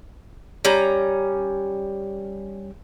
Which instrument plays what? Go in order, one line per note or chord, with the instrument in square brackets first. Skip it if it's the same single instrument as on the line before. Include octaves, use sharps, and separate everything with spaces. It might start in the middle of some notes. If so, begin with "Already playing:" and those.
[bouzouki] G3 C#4 A#5